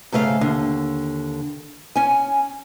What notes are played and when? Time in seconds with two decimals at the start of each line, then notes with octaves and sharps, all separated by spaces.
0.12 G#2 C#3 A3 A4 F5
0.41 D#2 D3
1.96 C#4 G#5